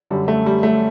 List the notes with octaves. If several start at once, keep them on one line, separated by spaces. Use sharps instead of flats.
F#2 D3 G3
A3
G3
A3